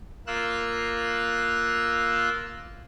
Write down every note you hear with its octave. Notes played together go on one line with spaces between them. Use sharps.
A#3 F4 E6 F#6